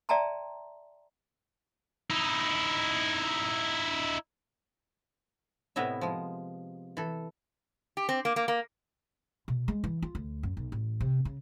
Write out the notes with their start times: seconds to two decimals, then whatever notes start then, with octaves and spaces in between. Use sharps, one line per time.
0.09 D5 E5 G5 A5 A#5 C6
2.10 D#4 E4
5.76 A2 C3 B3 E4 D#5 E5
6.01 F3 G#3
6.97 E3 A4
7.97 G4
8.09 C4
8.25 A#3
8.36 A#3
8.48 A#3
9.48 B2
9.68 G#3
9.84 E3
10.02 F4
10.15 D2
10.43 F#2
10.57 B1
10.72 A1
11.00 C3
11.25 C#3